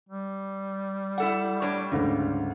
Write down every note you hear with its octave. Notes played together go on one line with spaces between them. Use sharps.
G3
E4 A4 F#5
A2 D4 C#5
D2 G#2 C#3 E3